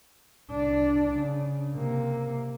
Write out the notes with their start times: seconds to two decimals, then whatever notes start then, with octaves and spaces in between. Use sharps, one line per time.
0.51 C2 D4
1.13 C#3
1.74 C3 A#3